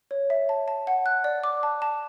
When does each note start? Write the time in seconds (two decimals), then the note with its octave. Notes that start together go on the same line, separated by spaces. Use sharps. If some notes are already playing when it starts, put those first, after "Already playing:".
0.11 C#5
0.30 E5
0.49 A5
0.68 A5
0.87 F#5
1.06 F#6
1.24 D5
1.44 D6
1.63 A5
1.82 A5